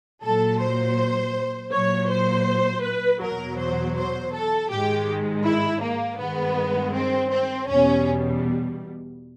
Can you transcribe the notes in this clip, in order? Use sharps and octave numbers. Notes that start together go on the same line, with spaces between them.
A#2 F#3 A4
C5
A#2 F#3 C#5
C5
B4
E2 B2 F#3 A#4
C5
C5
A4
G#2 D#3 G#3 G4
E4
A#3
G2 D#3 G#3 B3
C4
C4
E2 B2 G3 C#4